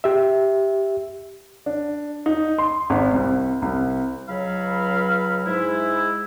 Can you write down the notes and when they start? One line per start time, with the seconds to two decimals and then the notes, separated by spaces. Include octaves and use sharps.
0.04 G4 E5
1.66 D4
2.26 D#4
2.58 C6
2.90 G#1
3.13 C2
3.62 C2
4.29 C#2 F#3 F5 B5
5.46 G#2 G#3 E4